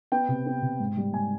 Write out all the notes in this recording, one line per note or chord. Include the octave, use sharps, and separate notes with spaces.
B3 G5
C3
B3
C3
G#2
G3
G#2 G#5